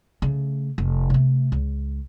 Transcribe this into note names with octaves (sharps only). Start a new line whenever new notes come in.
C#3 A3
F1
C3 A3
C#2